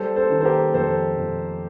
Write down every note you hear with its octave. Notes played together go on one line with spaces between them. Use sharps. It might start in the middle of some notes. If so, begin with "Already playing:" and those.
Already playing: G3 A4 C5
A4 C5
D#3
C5
G4 A#4
F2 A4 C5
F2